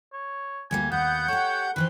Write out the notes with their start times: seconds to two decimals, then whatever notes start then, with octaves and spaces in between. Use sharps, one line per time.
0.13 C#5
0.71 D2 G3 A#3 G#5
0.92 D#2 B3 F#5 G6
1.28 G4 A4 C#5
1.76 D#3 E3 B4 C5